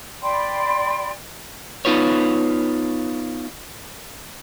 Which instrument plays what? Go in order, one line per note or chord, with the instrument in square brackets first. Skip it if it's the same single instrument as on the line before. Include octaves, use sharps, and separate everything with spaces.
[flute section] D5 G5 B5 C6
[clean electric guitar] B3 D#4 F4 B4 C#5